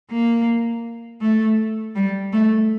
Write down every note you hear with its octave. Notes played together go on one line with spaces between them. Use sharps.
A#3
A3
G3
A3